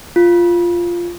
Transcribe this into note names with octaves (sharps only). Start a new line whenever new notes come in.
F4